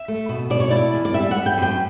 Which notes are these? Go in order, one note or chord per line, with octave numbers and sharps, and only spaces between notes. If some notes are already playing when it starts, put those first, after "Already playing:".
Already playing: E5
A3
B2
B2 D5
C#5
E4 D5
E2
D5
G3 E5
F#5
B3
G5
F#2 G5